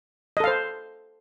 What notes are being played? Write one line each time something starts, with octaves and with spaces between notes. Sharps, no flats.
A4 C5 D#5 F5